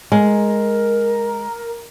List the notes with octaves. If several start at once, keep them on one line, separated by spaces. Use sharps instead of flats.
G#3 A#4